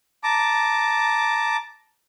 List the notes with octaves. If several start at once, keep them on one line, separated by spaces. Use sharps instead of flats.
A5 A#5 D6